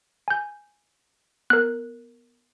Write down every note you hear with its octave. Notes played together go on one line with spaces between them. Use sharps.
G#5 G6
B3 A#4 F#6